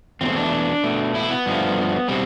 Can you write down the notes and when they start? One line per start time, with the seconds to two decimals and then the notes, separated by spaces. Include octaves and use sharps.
0.21 E2 B2 A3 C4
0.37 D4
0.84 B2 A3
1.15 E4
1.31 B3
1.46 G2 F3 A3
2.08 B2 G3 C4